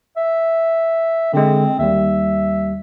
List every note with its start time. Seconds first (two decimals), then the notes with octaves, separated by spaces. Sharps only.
0.17 E5
1.33 D3 G#3 C4
1.79 D#2 G3 E5